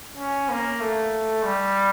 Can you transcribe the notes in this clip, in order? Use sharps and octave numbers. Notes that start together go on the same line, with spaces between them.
C#4
A#3
A3
G3